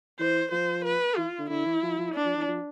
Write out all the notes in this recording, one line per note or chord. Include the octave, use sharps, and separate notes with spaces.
E3 C5
F3 C5
B4
E3 F4
D3
D3 E4
E3
F3
F3
D4
F3
E3
F3